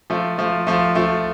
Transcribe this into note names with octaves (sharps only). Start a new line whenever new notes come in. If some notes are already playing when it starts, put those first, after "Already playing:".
F3 A3
F3 A3
F3 A3
F3 A3